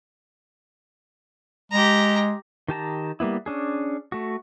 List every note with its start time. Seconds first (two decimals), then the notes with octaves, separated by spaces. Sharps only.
1.72 G#3 G4 A#5
2.68 D#3 G4 A5 A#5
3.20 G3 A#3 B3 E4
3.46 C#4 D4 G#4
4.12 A3 F#4